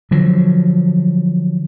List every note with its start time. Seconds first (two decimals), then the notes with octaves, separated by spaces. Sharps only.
0.11 D3 F3 F#3